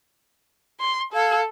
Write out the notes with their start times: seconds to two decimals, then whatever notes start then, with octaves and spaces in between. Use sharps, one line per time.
0.80 C6
1.13 A4 F5 G#6